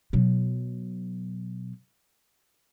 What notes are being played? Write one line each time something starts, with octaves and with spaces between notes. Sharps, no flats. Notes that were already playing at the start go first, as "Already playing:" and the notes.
B2 F#3